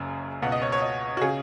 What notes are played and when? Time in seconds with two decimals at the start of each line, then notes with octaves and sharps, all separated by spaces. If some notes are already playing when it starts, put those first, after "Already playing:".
Already playing: F#1 F#2 C#3 G#5
0.42 C#2 B2 F#5
0.52 D#5
0.62 C#5
0.72 C#5
0.82 D#5
1.17 F#4
1.21 C#3 G#4